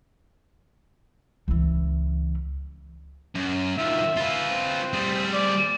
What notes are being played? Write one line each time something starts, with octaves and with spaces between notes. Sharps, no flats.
C#2 E3
F#2
D#3 F3 E5
F4 B4
C4
G3 G#4
D5